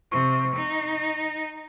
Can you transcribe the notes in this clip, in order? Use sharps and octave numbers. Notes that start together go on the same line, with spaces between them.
C3 C#6
D#4